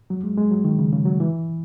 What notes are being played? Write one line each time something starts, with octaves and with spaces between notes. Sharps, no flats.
F#3
G#3
G#3
F#3
D#3
C#3
C#3
F#3
E3